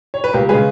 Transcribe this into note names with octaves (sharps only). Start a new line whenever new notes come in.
C#5
B4
C#2 G4 A#4
C#3 G#3 G#4 B4